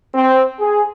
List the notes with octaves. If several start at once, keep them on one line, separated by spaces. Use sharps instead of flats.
C4
G#4